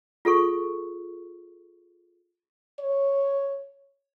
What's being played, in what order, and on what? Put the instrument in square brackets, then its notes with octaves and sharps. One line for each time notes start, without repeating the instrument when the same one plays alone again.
[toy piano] F4 G#4 A4 C#6
[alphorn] C#5